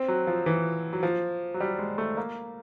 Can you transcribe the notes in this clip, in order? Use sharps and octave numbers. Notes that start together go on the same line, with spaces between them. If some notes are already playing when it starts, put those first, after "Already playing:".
Already playing: C4
F#3
F3
E3
F#3
F3
F#3
G3
G#3
A3
A#3